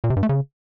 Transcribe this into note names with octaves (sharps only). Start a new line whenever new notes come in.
A#2
C3
G2
A3
C#3